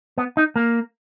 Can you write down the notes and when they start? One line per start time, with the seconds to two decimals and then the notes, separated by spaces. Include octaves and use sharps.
0.18 B3
0.37 D#4
0.56 A#3